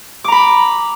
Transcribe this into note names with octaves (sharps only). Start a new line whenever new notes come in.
A#5 B5 D6